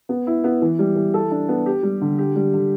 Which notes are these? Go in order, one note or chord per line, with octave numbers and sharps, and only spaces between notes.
B3
E4
B3
E3
G3
E3
A4
D4
B3
G4
G3
D3
G4
G3
D3